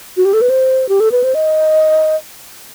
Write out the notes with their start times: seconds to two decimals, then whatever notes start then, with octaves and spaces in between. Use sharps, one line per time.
0.17 F#4
0.25 G4
0.33 A4
0.41 B4
0.49 C5
0.89 G4
1.00 A4
1.12 B4
1.24 C5
1.35 D#5